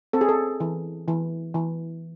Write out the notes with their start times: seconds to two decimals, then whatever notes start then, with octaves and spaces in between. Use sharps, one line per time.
0.13 C4 A4
0.21 G#4
0.29 A4
0.60 E3
1.08 E3
1.54 E3